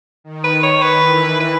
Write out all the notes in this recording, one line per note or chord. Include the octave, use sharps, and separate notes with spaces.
D#3
B4
D#3 C#5
B4
E3
B4